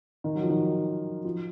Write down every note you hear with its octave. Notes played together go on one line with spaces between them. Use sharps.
D#3
F#3
F3
D#3
F3